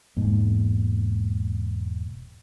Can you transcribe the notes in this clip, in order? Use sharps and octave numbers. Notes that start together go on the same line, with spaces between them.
E1 G#2 G#3 A#3